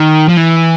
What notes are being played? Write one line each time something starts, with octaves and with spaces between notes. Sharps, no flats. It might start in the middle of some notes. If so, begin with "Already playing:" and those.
Already playing: D#3
F3
E3